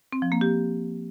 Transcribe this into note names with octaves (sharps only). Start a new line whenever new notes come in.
C4
F3
A#3
G4